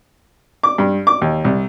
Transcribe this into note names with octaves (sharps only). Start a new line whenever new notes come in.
D6
G2
D6
D#2
C2